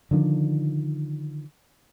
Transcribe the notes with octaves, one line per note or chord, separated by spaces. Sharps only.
D3 D#3 F3 D4